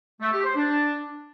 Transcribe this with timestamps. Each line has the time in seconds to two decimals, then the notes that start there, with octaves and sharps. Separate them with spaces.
0.21 A3
0.33 G4
0.44 C5
0.56 D4